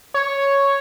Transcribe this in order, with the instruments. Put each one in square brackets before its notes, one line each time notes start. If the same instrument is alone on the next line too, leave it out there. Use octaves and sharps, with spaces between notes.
[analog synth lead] C#5